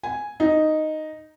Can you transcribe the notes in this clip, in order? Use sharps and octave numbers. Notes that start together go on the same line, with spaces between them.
G#5
D#4